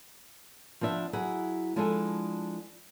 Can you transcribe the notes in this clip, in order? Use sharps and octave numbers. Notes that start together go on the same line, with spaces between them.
F3 B3 D4 E5
F#3 E4 G#4 F#5
F3 G#3 D4 E4 G#4 A4